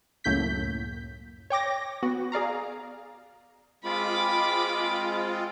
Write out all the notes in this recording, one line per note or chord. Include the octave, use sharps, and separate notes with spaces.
C#2 F#2 A2 A#3 G6 B6
C#5 G5 D6 A#6
B3 F#4
G#4 D5 F5 A#5
G#3 C4 F4 B5 D6